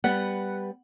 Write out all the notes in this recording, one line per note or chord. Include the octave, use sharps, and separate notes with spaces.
G3 B3 F#5